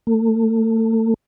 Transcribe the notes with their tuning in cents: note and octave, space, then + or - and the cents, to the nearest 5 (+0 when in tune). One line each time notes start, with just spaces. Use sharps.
A3 +35